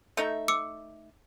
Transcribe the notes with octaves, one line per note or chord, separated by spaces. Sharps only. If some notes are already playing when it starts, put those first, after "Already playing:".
A3 D#4 E5
D6 E6 C#7